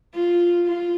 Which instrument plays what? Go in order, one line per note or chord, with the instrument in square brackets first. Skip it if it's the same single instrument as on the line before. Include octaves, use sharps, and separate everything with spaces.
[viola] F4
F4